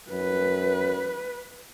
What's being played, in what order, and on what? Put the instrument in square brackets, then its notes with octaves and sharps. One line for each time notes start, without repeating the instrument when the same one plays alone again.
[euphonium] F#2 [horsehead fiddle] B4